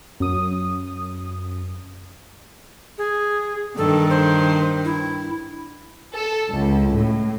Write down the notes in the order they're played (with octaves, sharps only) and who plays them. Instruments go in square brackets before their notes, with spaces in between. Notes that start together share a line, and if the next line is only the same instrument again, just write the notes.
[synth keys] F#2 D#6
[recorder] G#4
[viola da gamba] G2 D#3 [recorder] A4
[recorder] C5
E4
[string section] A4
C#2
A2